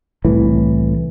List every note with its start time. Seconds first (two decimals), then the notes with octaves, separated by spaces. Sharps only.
0.25 C2 A2 E3